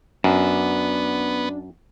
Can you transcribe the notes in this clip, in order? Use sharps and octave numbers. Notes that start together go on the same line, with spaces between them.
F#2 B3 D4